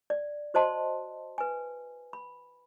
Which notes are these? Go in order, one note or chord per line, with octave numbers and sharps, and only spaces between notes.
D5
F#4 C5 D#5 A5 C6
B4 G#5
B5